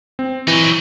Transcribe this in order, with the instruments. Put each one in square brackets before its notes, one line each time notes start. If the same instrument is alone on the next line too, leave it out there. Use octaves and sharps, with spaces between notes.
[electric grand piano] C4
[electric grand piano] E3 [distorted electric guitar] F#3 D#4